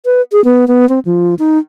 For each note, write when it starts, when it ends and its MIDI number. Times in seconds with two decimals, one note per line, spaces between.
0.05 0.21 71
0.32 0.43 68
0.44 0.67 59
0.68 0.88 59
0.89 0.99 60
1.05 1.35 53
1.39 1.58 63